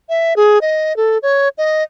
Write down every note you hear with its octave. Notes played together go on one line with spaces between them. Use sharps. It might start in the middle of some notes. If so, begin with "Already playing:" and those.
E5
G#4
D#5
A4
C#5
D#5